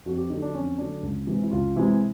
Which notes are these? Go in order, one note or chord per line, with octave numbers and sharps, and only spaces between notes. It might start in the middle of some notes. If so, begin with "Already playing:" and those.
F2 F#4
G4
D3 F#3 A3 D#4
D4
F2 C#4
D3 F#3 A3 D4
C#2
C3 E3 G#3
E4
C#2 F4
C3 E3 G#3 E4